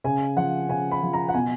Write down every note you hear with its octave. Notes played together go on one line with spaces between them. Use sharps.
C#3 G#5
F3 F#5
C#3 G#5
B5
F3
A#5
F#5
B2 G#5